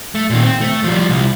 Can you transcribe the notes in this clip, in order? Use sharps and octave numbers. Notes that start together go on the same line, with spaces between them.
A3
A#2 D#3
C4
A3
F3 G3
C2